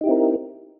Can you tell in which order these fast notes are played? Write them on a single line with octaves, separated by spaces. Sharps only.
D#4 G4 E4 C4 A#4